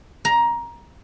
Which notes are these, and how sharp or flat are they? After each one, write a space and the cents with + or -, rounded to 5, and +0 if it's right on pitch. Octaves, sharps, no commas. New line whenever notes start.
A#5 +15